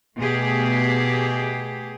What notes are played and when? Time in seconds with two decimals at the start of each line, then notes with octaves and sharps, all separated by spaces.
0.16 B2 A3 G4 G#4